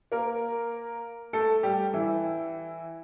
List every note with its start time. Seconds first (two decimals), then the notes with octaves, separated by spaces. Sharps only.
0.12 A#3 A#4
1.33 A3 A4
1.63 G3 G4
1.94 E3 E4